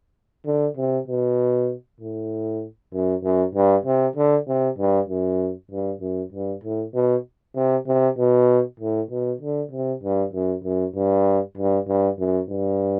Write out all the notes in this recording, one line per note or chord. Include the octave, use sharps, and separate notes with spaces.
D3
C3
B2
A2
F#2
F#2
G2
C3
D3
C3
G2
F#2
G2
F#2
G2
A2
B2
C3
C3
B2
A2
B2
D3
C3
G2
F#2
F#2
G2
G2
G2
F#2
G2